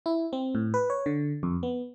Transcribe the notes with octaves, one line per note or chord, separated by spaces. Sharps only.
E4
C4
A2
B4
C#5
D3
F2
B3